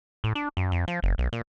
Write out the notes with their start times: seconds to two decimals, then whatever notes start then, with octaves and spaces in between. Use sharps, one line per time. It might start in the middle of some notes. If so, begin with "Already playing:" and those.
0.24 A2
0.35 D4
0.57 F#2
0.72 F2
0.88 F3
1.03 F#1
1.18 B1
1.33 A#2